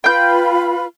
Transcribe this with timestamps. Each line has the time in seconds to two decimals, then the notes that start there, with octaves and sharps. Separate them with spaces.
0.04 F4 B4 G5 B5 G6